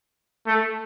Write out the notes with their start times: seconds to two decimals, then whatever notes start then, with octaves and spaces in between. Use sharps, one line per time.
0.47 A3